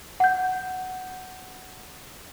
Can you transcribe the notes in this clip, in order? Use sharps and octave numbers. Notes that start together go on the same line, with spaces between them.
F#5 G6